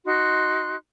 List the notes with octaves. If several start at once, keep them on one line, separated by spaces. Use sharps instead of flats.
D#4 F#4 C6 F#6